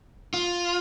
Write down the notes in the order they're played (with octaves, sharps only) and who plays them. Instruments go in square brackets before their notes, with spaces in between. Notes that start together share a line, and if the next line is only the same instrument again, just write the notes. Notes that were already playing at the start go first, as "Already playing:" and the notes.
[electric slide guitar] F4